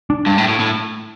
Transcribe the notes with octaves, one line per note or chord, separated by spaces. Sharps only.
D4
G2
A2
A2
A2